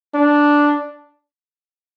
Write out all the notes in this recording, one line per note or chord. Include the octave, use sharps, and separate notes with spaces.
D4